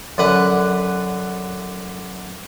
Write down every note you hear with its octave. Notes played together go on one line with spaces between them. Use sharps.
F#2 D3 B4 F#5